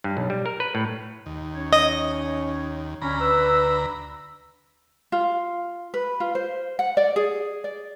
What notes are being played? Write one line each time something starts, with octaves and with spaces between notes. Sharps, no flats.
G2
B1
G3
A#4
B4
A2
D#2
C#4 C#5
D#5
D2 C#4 A#5 B5
B4 E6
F4
B4
F4
C5
F#5
D5
G#4
D5